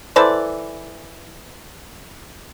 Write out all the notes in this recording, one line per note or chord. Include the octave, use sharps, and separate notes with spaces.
E3 A4 C5 D5